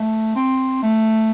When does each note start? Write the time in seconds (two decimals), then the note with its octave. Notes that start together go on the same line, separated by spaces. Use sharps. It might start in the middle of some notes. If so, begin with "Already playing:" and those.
Already playing: A3
0.36 C4
0.83 A3